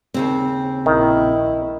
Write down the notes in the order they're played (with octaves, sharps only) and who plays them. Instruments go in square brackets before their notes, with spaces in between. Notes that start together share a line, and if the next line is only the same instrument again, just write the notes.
[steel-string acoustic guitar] D#2 C#3 C4
[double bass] A#1 E4 [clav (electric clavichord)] D#3